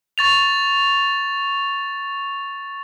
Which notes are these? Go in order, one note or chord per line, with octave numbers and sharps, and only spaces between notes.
C#6 A6 F7